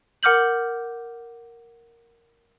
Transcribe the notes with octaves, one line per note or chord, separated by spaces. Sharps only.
A#4 F#5 D6 F6 G6 F#7